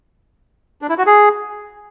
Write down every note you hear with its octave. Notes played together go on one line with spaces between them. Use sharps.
D4
E4
F#4
G#4